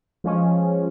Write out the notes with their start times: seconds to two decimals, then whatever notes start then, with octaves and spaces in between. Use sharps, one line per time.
0.24 F3 G#3 C#4